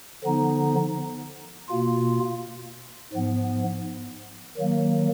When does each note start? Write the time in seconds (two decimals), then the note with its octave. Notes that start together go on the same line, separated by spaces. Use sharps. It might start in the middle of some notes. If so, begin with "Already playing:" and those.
0.24 D3 F3 B3 D#4
1.69 B2 A#3 F4
3.13 G#2 F3 B3
4.58 D#3 F#3 A#3